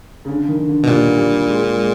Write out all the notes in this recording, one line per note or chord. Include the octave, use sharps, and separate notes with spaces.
C#3
D3
D#3
D3
B2
A#2 G3
G3
G#3
G#3